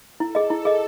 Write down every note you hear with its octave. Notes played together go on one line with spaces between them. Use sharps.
E4 A4
G#4 D#5
E4
G#4 D#5